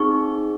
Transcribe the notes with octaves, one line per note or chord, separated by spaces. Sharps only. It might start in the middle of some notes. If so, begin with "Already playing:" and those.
Already playing: C4 D#4 G#4 C#6